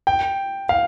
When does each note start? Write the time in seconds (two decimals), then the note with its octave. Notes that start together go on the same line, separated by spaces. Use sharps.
0.07 G5
0.69 F5